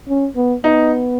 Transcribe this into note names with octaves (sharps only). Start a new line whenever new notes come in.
C#4
B3
B3 D#4